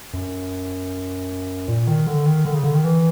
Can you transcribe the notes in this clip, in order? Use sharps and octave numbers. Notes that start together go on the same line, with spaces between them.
F#2
A#2
D#3
D3
D#3
D3
C#3
D3
D#3
E3